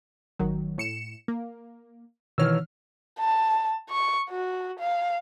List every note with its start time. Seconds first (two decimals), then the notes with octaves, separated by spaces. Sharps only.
0.39 G#1 D#3 F#3
0.78 A2 C#7 E7
1.28 A#3
2.38 B2 D#3 E3 C#5 E6 F6
3.20 A5
3.90 C#6
4.30 F#4
4.79 F5